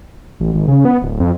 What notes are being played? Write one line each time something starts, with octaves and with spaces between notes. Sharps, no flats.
A1
G#1
C#3
B3
D1
F2